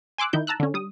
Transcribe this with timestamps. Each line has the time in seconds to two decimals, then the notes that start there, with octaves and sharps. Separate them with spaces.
0.18 G#5 C6 D6 E6 F#6
0.33 D#3 D#4 E4 G6
0.47 A5 A#5 E6 F#6
0.60 D3 C#4
0.74 G3 D#6